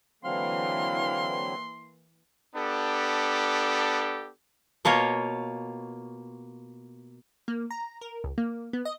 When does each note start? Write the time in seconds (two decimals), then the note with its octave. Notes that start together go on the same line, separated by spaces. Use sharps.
0.24 D3 E3 F#3 A#3 C4 F5 C6
2.55 B3 D4 G4 A4
4.85 B2 A#3 F4 C#5
7.48 A#3
7.71 A#5
8.01 A#4
8.24 C#2
8.38 A#3
8.73 B3
8.85 D#5